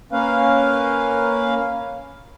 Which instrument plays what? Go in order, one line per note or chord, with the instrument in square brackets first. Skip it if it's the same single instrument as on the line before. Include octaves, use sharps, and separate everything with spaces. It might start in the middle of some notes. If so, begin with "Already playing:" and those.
[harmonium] A#3 C#4 B4 F5